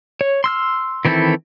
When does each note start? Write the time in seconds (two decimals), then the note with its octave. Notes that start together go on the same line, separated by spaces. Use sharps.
0.21 C#5
0.44 C6 E6 F6
1.05 D#3 E3 C4 E4 A4